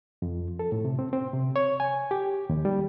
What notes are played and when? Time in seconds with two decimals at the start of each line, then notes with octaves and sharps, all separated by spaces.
0.22 F2
0.59 A4
0.72 A2
0.85 C3
0.99 C4
1.13 C4
1.33 C3
1.56 C#5
1.80 G#5
2.11 G4
2.50 D#2
2.65 G3